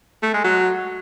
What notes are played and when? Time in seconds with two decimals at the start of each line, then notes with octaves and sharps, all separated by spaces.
0.23 A3
0.34 G#3
0.44 F#3